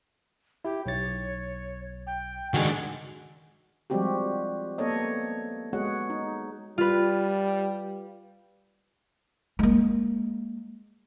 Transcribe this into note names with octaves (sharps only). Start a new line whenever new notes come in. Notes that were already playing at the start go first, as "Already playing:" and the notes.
E4 G4
B1 C#5 A6
G5
D#3 G#3 D4 F#4 G#5
F3 G3 G#3 C4 F#4 G4
A#3 B3 A4 C#5 D#5
G#3 B3 F#4 G#4 C#5 F#5
D#4
G3 F4 B4
G#3 A#3